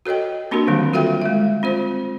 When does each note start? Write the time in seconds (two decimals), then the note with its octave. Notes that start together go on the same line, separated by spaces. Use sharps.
0.06 F#4 A4 C#5 D#5 G5
0.51 A#3 C4 D4 F#4 G4 A#4
0.67 D3 D#3 F#3 G3 C4
0.93 F4 F#4 A4 E5 F5 G5
1.22 G#3 E5
1.63 C4 F4 C5